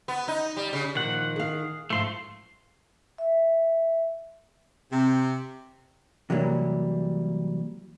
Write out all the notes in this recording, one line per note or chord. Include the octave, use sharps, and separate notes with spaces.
B3
D#4
G3
C#3
A#2 D#3 F3 F#5
G#4 F5
G#2 F3 A3 F4 C6
E5
C3
C3 E3 F#3 G3 A#3